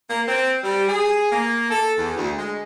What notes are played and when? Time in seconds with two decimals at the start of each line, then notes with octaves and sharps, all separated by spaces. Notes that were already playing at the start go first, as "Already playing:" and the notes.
0.10 A#3
0.28 C4
0.64 G3
0.89 G#4
1.32 A#3
1.71 A4
1.98 E2
2.17 D2
2.38 G#3